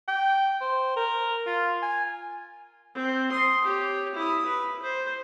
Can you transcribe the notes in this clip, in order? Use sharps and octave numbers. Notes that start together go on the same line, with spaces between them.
G5
C5
A#4
F4
G#5
C4
C6 D#6
G4 C#5
E4 D#6
B4
C5